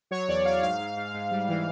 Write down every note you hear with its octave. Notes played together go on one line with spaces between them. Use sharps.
F#3 C#5
E2 D5
F#3 F5
G#2 F5
G#2
G#2
G#2
G3
E3